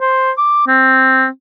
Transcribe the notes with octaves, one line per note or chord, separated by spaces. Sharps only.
C5
D6
C4